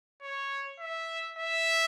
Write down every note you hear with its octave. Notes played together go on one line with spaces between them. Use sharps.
C#5
E5
E5